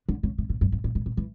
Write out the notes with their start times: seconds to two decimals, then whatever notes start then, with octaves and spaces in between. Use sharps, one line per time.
0.09 D3
0.23 C#3
0.38 C3
0.50 B2
0.61 G2
0.72 G#2
0.84 A2
0.95 A#2
1.06 B2
1.17 E3